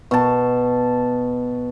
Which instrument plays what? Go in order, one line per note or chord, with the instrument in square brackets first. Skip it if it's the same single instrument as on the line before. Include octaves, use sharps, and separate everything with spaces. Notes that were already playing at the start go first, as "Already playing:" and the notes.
[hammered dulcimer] B2 A5